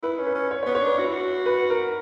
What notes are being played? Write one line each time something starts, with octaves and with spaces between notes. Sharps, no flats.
E4 B4
C#4
B4
C#4
C#5
C#5
B3
C#5
D4 B4
F#4
E4
F#4
B4
A#4